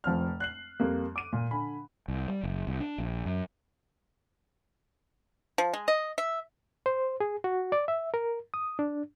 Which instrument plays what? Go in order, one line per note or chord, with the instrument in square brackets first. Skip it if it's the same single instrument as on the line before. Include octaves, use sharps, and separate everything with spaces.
[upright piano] F1 F3 C4 F6
F#6 C7 F#7
F2 G3 A#3
D6 D#7
A#2
D3 G#5 B5
[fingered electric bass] C2
G3
F#1
C2
D4
A#1
F#2
[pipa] F3
G#3
D#5
E5
[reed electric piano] C5
G#4
F#4
D5
E5
A#4
D#6
D4